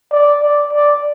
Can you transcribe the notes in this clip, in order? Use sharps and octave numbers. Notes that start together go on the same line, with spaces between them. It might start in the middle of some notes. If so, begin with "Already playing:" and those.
D5
D5
D5